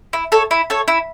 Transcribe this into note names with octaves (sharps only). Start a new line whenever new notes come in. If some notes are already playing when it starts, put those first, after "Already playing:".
E4
A4 C#5
E4
A4 C#5
E4